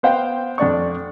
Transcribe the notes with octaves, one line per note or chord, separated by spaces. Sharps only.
B3 C5 F5 G5
F2 D4 D5 C#6